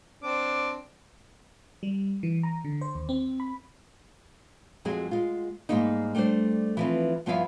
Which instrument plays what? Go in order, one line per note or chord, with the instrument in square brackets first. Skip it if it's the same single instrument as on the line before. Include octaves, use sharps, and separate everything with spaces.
[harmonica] C4 D4 [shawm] D6
[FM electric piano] G3
E3
A#5
D3
C5
D#2
C4
B5
[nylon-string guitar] F2 F#3 G#3 G#4
G#3 F4
G#2 G3 G#3 A#3 D#4
G3 A3 D4 G4 C5
E3 F3 C4
G2 F3 B3 E4 E5 F5